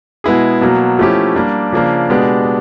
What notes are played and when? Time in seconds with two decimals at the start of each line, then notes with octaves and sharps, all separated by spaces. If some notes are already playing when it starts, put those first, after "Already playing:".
0.24 B2 G#3 B3 E4 G#4
0.61 B2 F#3 A#3
0.99 F3 A3 C#4 E4 G4
1.35 G3 A#3 D4
1.72 C#3 F3 A#3 D4
2.10 B2 G#3 B3 D4 G4